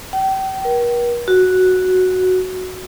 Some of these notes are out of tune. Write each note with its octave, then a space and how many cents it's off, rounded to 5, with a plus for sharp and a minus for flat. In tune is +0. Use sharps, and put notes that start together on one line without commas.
G5 -35
A#4 +45
F#4 +0